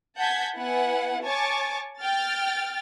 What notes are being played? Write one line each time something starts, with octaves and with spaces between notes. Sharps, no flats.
F#5 G#5 A5 G6 G#6 B6
B3 E4 F#5 G#5
C#5 G#5 A5 C#6 D6 A6
G5 F6 A6